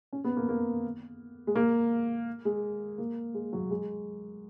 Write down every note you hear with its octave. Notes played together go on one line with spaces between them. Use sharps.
C#4
B3
A#3
A#3
G#3
A#3
G#3
A#3
G#3
F#3
G#3